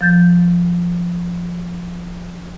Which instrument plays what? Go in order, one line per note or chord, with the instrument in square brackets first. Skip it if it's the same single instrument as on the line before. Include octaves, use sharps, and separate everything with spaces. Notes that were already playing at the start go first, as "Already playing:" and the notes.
[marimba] F3 G6 A6